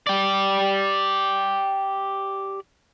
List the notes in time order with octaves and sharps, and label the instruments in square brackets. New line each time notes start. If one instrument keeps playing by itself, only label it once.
[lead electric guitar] G4 D5